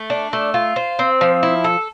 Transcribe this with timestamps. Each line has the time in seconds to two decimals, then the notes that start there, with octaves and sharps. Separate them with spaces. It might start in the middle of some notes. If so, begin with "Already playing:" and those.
Already playing: A3
0.10 D4
0.33 A3
0.54 F4
0.76 C5
0.99 C4
1.21 F3
1.43 E4
1.64 A4